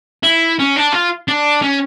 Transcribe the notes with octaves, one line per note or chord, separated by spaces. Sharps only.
E4
C#4
D4
F4
D4
C#4